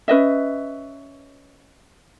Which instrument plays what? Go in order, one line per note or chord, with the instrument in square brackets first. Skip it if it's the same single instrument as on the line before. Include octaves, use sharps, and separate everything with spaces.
[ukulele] C#4 B4 D#5 E5